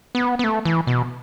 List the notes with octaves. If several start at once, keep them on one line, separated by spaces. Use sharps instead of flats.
B3
B3
A3
E3
B2